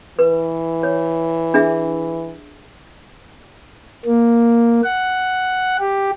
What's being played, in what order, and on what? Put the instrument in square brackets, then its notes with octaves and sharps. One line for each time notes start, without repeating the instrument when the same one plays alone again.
[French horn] E3 [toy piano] B4
[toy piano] C#5
D4 G#4 E5
[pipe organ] A#3
F#5
G4